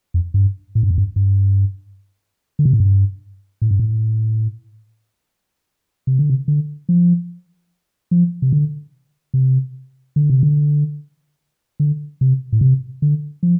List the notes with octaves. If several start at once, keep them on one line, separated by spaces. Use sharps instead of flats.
F2
G2
A2
G2
F2
G2
G2
D3
C3
A2
G2
A2
G2
A2
C3
D3
C3
D3
F3
F3
C3
D3
C3
D3
C3
D3
D3
C3
A2
C3
D3
F3